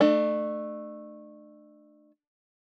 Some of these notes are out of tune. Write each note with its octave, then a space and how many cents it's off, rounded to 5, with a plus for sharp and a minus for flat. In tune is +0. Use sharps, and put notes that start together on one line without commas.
A3 +0 D4 +40